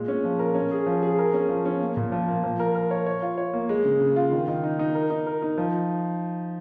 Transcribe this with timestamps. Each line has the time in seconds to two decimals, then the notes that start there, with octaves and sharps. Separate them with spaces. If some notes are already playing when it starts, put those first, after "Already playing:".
Already playing: A#2 G#3
0.08 C#4
0.24 F3
0.39 A#4
0.55 C#4
0.71 G#4
0.87 F3
1.02 G#4
1.18 A#4
1.34 C#4
1.49 F3
1.65 C#4
1.81 A#3
1.97 A#2
2.12 F3
2.28 A#3
2.44 F3
2.60 A#4
2.75 A#4
2.91 C#5
3.06 C#5
3.22 F4
3.38 C#5
3.53 A#3
3.69 G#3
3.85 C#3
4.01 C#3
4.16 F4
4.32 D#3
4.48 D#3
4.64 D#4
4.79 D#4
4.95 A#4
5.11 D#4
5.26 A#4
5.42 D#4
5.58 F3